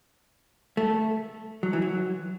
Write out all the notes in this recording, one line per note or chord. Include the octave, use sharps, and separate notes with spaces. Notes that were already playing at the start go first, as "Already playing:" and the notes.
A3
F#3
E3
F#3